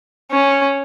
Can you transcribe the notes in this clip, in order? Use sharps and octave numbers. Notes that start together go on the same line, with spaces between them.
C#4